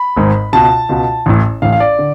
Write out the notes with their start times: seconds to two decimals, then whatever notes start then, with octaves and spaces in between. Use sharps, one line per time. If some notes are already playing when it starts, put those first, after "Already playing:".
Already playing: B5
0.16 G#1 G#2
0.53 C#2 B2 A5
0.89 C#2 B2
1.26 A1 A2
1.62 A1 A2 F5
1.72 F5
1.80 D5
1.99 D3